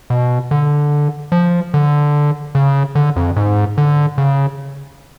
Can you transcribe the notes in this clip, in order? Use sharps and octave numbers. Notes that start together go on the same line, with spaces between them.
B2
D3
F3
D3
C#3
D3
F2
G#2
D3
C#3